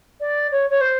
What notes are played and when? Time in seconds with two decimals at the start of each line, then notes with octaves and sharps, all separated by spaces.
0.21 D5
0.52 C#5
0.70 C#5
0.81 C5